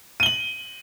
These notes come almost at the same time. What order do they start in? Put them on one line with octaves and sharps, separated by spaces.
D#7 G7 F#7